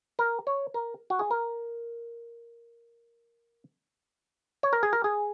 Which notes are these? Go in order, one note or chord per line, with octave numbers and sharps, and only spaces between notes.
A#4
C#5
A#4
F#4
G#4
A#4
C#5
A#4
G#4
A#4
G#4